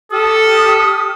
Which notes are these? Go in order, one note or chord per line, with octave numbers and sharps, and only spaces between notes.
G4 A4 D#6 F6